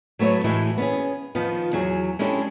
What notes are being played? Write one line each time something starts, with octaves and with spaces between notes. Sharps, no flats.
F#3 A3 B3 E4 C#5
A2 E3 G#3 E4 F#4
B3 C#4 G#4
D#3 F3 B3 D#4 F4
E2 F#3 G#4
G#3 C#4 D4 E4 G4 A4